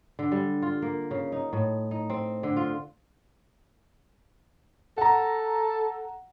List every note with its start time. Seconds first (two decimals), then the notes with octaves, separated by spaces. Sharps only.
0.19 D3
0.32 G3
0.62 F4
0.82 A#3
1.11 C#3
1.32 D#4
1.53 A2
1.91 D#4
2.10 C4
2.43 D3
2.57 F4
4.98 A4 F#5 A#5